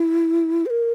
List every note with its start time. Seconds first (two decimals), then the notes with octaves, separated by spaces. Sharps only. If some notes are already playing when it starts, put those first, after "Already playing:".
Already playing: E4
0.66 C5
0.70 A#4